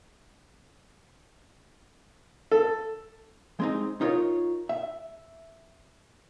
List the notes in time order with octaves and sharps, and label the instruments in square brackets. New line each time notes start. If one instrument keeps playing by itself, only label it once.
[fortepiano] A4
[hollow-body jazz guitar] G#3 C4 D#4
D#4 F4 A#4 C#5
E5